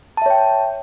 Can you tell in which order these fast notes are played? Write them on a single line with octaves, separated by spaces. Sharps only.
A5 E5 C#5 G5